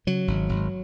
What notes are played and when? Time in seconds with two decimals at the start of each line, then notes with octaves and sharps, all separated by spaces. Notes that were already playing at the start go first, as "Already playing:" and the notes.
0.07 C#3 F#3
0.28 G#1
0.49 G#1